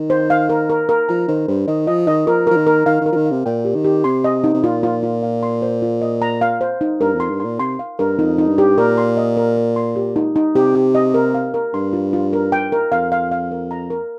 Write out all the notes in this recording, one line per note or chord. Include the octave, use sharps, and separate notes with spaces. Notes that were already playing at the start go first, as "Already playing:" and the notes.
Already playing: D#3
C5
F5
A#4
A#4
A#4
F3 A#5
D#3 C5
G2 C5
D#3 D#5
F3 D#5
D#3 D#5
F3 A#4
F3 A#4
D#3
A#4
D#3 F5
D#3 A#4
F3
D#3
F5
C3
A#2 G5
G4
D#3
G4
C3 C6
D#5
D#4
C3
A#2 F4
F4
F4
F5
C6
C5
F4
D#5
A#5
F5
C5
D#4
G2 A#4
F2 C6
G2
A#2 C6
C3 C6
F5
G2 A#4
F2 D#4
D#4
G2
G4
A#2 A#4
C6
D#5
A#4
A#4
C6
G4
D#4
D#4
C3 G4
G4
D#5
A#4
F5
A#4
G2 C6
F4
F4
A#4
G5
A#4
F2 F5
F5
F5
A#4
A#5
A#4